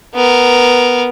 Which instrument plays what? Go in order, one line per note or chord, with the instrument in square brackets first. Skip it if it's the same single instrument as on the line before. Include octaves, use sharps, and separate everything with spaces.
[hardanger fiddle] B3 A#4